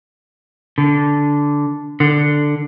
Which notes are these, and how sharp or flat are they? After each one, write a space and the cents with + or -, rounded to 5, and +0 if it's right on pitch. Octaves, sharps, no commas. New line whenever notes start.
D3 -10
D3 +5